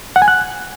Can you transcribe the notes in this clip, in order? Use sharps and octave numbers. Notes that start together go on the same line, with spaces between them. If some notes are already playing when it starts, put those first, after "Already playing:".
F#5
G#5
F#6